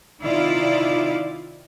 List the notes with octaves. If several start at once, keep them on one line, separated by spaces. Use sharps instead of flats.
C3 D#3 E4 F4 D5